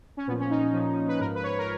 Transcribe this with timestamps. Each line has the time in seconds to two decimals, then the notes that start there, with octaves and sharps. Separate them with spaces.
0.17 C#4
0.27 A#2 B3
0.31 F3
0.39 C#4
0.50 D#4
0.73 A#2 F3
1.08 B4
1.20 G#2 F3 A#4
1.35 B4
1.43 C#5
1.58 A#4